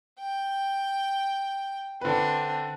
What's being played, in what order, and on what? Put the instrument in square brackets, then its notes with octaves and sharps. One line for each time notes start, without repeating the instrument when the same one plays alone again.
[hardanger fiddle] G5
[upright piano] D3 B4 [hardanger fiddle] C4 D4